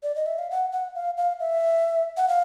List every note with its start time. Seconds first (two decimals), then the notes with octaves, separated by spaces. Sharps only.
0.03 D5
0.16 D#5
0.26 E5
0.38 F5
0.51 F#5
0.72 F#5
0.95 F5
1.17 F5
1.40 E5
2.17 F#5
2.28 F5